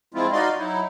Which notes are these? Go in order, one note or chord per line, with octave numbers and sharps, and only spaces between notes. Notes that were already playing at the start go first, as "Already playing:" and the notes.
F3 G#3 C4 E4 F4
D#4 F#4 D5 D#5 F5 C6
F#3 D#4 E4